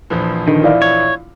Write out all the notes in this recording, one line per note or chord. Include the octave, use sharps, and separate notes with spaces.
A#1 E3 F3
D3 D#3
E4 D5 F5
C#5